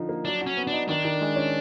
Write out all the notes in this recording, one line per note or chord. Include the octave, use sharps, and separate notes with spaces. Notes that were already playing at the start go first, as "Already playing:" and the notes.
Already playing: D3 F3 D#4
A#3
F#3 D4
F#4
C#4
B3
D4 D#4
D#3 D4
D#3
G#3
C#4